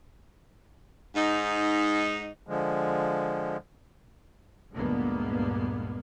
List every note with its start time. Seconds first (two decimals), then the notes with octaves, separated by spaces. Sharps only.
1.15 G#2 D#4
2.47 D3 F3 G#3
4.74 D2 G2 A#2 G#3 A#3 B3